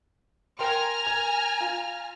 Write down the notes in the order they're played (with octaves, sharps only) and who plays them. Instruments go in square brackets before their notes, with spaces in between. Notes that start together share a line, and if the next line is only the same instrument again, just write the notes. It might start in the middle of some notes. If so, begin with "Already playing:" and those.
[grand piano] A#4 G5 C6 [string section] G#5 A#5 F6
[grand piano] A#4 G#6
F4